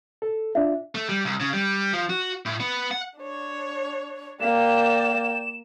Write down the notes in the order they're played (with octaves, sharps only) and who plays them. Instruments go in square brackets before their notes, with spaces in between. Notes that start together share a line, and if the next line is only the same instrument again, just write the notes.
[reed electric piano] A4
[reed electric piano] D4 F4 [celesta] E5
[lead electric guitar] A3
G3
C2
C#3
G3
F3
F#4
A2
B3
F#5
[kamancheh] D4 C#5
[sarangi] A#3 [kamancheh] D5 G5 [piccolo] E7